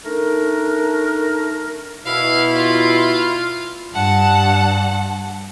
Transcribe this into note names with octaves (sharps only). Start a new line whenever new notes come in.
A3 D4 D#4 A#4
B2 E4 F5
F4 F5
G2 F#5 A5